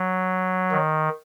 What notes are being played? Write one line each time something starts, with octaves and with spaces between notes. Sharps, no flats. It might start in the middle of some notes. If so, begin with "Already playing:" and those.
Already playing: F#3
D#3